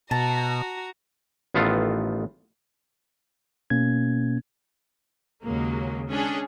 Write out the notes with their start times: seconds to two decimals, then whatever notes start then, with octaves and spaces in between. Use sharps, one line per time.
0.11 B2 F#4 A5 A#5
1.54 A1 D#3 B3 F4 A4 F5
3.70 B2 A#3 C#4 G#6
5.43 D#2 C#3 F#3 G#3 A#3
6.10 G#3 C#4 D4 G#4 C#5